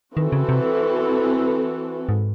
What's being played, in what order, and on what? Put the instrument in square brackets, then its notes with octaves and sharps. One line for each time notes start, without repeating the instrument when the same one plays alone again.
[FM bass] D#3 [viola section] E3 C4 F#4 A4
[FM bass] C#3
C3
G#2